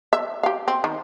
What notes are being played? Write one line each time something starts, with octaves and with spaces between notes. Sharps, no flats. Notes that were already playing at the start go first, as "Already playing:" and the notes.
E5
G4 F5
C4
D#3